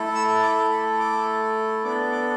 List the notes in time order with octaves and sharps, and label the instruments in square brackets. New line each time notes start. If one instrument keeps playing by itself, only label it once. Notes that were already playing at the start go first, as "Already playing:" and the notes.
Already playing: [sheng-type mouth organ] A3 E4 A4
E6
D6
B5
D6
B3 D4 A4 D6
D6